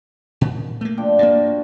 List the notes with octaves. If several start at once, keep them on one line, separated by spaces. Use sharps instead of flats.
A#2
A3 A#3
F3 D4 G5
G2 A#3
F#4